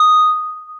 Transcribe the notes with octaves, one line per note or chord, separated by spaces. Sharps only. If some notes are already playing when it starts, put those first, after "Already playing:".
Already playing: D#6